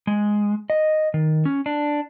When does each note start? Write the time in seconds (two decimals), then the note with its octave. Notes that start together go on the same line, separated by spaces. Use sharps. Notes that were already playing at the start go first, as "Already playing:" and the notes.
0.07 G#3
0.70 D#5
1.14 D#3
1.45 C#4
1.66 D4